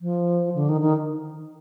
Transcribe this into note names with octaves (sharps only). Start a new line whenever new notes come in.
F3
D3
D#3
D#3